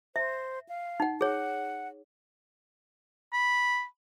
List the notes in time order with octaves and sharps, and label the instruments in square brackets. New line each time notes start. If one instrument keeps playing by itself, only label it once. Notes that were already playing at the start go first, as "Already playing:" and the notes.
[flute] C5 [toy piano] E5
[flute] F5
[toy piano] D#4 F#5
[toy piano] G#4 C#5 [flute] F#5
[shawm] B5